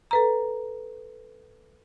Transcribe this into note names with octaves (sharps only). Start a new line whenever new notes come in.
A4 B4 A#5